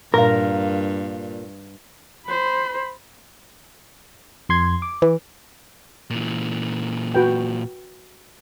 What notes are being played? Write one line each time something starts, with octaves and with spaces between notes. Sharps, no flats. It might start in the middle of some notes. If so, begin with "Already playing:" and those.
G2 A#2 A#4 F5
C5 B5
F2 C6 G#6
D6
E3
A#2 E3
F#4 B4 G5